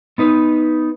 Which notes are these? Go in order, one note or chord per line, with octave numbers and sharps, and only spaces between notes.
B3 D#4 B4